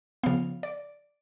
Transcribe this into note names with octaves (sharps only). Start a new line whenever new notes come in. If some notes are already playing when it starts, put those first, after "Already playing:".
C#3 F3 B3 F5
D5